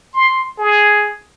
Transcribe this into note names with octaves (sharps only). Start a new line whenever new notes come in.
C6
G#4